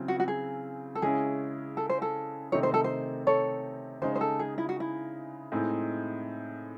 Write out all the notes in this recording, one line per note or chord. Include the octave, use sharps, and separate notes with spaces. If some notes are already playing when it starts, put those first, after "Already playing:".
Already playing: C#3 F#3 C4 E4
F#4
F#4
G#4
A4
C#3 G#3 C#4 E4 G#4
A4
C5
A4
C3 D#3 A3 C4 D#4 C#5
C5
A4
C5
A4 C#5
C#3 G#3 D#4 C5
C5
A4
G#4
E4
F#4
E4
A2 G#3 C4 D#4